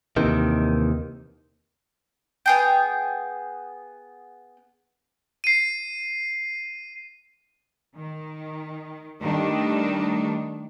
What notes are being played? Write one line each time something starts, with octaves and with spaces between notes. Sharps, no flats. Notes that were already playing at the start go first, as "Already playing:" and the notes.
D#2 C3 D#3 E3
B3 G#4 G5
C7 D#7
D#3
D#3 G3 A3 D4 D#4